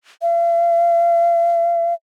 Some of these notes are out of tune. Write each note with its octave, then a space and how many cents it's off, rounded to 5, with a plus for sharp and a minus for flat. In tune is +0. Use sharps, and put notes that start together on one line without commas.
F5 -40